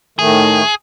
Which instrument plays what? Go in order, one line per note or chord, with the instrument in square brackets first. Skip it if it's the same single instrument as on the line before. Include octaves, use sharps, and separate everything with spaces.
[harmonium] A2 D#3 A3 [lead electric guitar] G#4